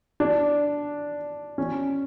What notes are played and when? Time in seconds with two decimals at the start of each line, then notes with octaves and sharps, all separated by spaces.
0.20 D4
1.58 C#4